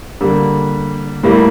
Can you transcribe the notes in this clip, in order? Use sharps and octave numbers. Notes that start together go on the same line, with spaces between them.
D3 G3 A#3
A2 G3 A#3